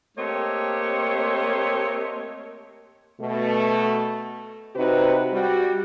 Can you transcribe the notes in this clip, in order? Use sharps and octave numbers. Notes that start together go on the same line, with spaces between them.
A3 A#3 C4 G4 C#5 D#5
B2 A3
C3 C4 D#4 F#4 B4
G3 F#4